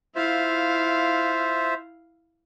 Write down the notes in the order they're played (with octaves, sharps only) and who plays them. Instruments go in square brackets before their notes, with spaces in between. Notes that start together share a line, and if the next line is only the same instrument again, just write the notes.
[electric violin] E4 F5 [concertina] F4 C5 E5